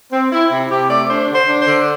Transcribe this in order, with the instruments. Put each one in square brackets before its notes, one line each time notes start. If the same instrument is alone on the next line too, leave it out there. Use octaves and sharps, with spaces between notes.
[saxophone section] C4
C4 E4
C3 E4
C3 G4
A3 D5
D4 C5
D3
C5
D4
C5
D3